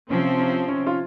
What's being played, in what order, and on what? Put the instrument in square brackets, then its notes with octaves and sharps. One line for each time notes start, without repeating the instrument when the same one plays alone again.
[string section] C3 F3 C4 [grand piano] C#4
[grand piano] C#4
C#4
F4